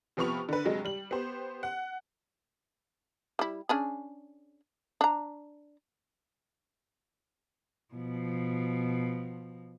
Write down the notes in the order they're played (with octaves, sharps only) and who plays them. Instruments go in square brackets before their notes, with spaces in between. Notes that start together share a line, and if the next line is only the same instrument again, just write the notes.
[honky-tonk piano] C3 F3 B3 B5 C#6 F7
D3 B4
G2 C3 F#3 G#3
G3 F#7
B3 G4 C5
F#5
[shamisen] G3 E4
C#4 D4 G#4
D4 A#5
[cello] B2 F3